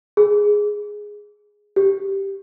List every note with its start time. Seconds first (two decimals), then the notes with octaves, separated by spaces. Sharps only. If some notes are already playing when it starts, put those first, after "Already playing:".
0.17 G#4
1.76 G4